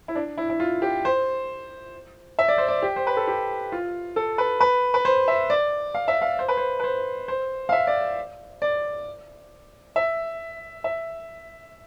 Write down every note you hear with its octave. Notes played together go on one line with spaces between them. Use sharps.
E4
D4
E4
E4
F4
G4
C5
E5
D5
C5
D5
G4
C5
B4
A4
G4
F4
A4
B4
B4
B4
C5
E5
D5
F5
E5
F5
C5
B4
C5
B4
C5
C5
F5
E5
D5
D5
E5
E5